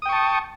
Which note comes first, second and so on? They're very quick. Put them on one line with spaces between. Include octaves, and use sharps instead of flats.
D#6 G5 C#6 A5